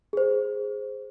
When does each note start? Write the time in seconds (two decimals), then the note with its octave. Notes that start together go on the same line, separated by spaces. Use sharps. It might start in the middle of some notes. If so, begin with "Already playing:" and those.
0.13 G#4 C5